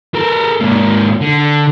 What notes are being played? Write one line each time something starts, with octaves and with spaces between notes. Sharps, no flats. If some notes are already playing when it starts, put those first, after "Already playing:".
A4 A#4
G#2 A#3
D3